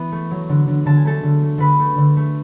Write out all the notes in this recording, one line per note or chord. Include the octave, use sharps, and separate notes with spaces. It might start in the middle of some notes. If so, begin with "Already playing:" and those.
Already playing: E3 B3 F#4
A3
F#3
D3
D3
D3 A5
G#5
A3 A4 A5
D3
A3
D3 B4 B5
A3
D3
A3